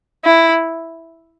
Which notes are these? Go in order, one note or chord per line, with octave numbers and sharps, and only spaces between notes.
E4